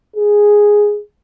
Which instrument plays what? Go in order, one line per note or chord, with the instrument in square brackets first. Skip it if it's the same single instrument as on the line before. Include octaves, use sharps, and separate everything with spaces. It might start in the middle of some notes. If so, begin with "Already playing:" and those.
[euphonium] G#4